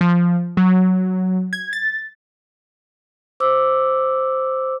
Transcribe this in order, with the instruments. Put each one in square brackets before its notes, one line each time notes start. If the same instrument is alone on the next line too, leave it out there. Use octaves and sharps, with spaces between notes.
[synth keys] F3
F#3
G#6
A6
[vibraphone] C5 D6 E6